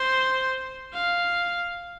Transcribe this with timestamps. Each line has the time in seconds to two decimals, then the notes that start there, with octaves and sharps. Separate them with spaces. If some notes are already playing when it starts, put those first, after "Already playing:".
Already playing: C5
0.93 F5